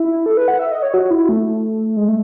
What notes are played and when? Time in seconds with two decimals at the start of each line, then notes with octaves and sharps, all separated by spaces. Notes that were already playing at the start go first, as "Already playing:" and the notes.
Already playing: E4
0.26 A4
0.37 B4
0.48 F#5
0.59 E5
0.72 D#5
0.83 C#5
0.94 F#4
1.11 E4
1.29 A3
1.97 G#3
2.08 A3